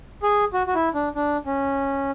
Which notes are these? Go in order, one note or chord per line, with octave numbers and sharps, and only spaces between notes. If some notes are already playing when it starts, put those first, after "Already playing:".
G#4
F#4
F#4
E4
D4
D4
C#4